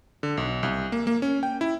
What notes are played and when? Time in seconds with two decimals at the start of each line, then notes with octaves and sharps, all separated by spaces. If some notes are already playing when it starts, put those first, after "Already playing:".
0.23 D3
0.37 B1
0.63 C2
0.92 A#3
1.07 A#3
1.22 C#4
1.43 G5
1.61 E4